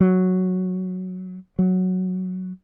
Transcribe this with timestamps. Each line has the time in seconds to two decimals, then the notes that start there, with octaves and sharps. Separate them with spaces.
0.01 F#3
1.59 F#3